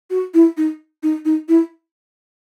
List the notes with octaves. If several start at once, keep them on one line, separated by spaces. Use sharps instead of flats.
F#4
E4
D#4
D#4
D#4
E4